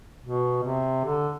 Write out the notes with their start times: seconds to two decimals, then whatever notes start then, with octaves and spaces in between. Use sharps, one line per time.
0.22 B2
0.64 C3
1.05 D3